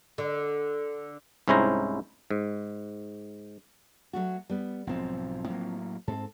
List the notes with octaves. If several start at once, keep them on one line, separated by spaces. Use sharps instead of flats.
D3
C2 G#2 C#4 E4 C5 A#5
G#2
F#3 A3 F#4
G3 B3
B1 G#2 F3 C4
A2 F#3 A#3
G#2 C4 A4